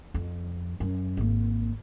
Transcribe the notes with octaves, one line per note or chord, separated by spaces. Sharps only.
F2
F#2
G#1 A#3